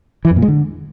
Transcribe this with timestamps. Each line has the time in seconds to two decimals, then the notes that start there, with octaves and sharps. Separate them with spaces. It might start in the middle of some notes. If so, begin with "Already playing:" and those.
0.25 E3
0.31 F2
0.36 A#2
0.42 G#3
0.48 D3